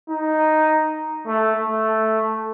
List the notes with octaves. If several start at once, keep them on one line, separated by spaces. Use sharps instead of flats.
D#4
A3
A3